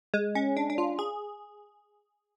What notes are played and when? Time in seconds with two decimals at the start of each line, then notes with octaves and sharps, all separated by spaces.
0.14 G#3
0.35 C#4
0.57 D4
0.70 D4
0.78 F4
0.99 G#4